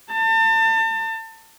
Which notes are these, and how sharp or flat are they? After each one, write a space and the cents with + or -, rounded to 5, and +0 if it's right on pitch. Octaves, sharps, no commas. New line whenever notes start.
A5 +35